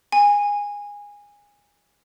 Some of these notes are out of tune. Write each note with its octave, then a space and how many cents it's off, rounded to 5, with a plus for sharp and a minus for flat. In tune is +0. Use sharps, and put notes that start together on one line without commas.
G#5 -20